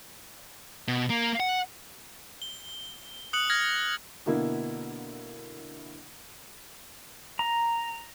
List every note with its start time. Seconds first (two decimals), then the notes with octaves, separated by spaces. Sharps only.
0.88 B2
1.10 A#3
1.40 F#5
2.42 G7
3.33 D#6 F#6 C#7 F#7
3.50 F6 G#6 A#6
4.26 B2 D3 A#3 E4
7.39 A#5